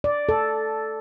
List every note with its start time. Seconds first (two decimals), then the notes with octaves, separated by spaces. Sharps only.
0.04 D5
0.29 A4